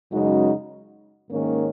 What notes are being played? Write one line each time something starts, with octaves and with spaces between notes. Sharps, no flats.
F#2 C#3 G#3 D#4 F#4
G#2 D#3 A#3 C#4